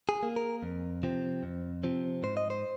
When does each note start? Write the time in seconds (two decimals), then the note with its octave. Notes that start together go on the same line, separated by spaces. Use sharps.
0.09 G#4
0.23 A#3
0.36 A#4
0.63 F2
1.03 C3 F3 C4
1.43 F2
1.83 C3 F3 C4
2.23 G#2 C5
2.37 D#5
2.50 C5